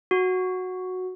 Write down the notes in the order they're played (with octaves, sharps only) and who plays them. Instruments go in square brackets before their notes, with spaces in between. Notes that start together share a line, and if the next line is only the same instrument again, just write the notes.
[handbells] F#4